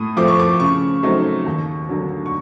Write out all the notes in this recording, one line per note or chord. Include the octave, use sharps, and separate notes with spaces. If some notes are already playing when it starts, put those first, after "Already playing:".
Already playing: A2 D#6
F3 A3 C4 D6
C#6
D6
C#3 C#6
F#3 A3 C4 D#4
D#2
D3 F#3
C#6